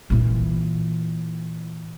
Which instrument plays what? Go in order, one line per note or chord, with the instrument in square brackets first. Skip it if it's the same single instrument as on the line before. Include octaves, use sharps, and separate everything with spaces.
[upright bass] A#2 E3